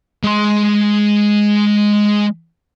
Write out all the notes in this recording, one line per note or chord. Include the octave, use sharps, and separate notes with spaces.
G#3 C6